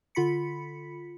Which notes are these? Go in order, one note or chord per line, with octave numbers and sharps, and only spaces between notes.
D3 F4 B5 B6 C#7